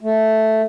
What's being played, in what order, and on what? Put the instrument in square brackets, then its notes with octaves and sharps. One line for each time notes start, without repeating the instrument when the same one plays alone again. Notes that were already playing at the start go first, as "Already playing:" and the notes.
[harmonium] A3